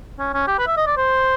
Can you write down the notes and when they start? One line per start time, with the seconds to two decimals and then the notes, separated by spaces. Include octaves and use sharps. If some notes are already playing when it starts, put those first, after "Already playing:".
0.19 C#4
0.34 C#4
0.48 G4
0.58 B4
0.67 E5
0.77 D#5
0.87 D5
0.97 C5